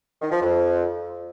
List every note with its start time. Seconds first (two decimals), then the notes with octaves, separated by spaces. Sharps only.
0.22 D#3
0.31 F3
0.41 F2